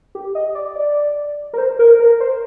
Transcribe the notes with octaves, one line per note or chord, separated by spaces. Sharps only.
G4
D#5
D5
D5
A#4
C5
A#4
A#4
C5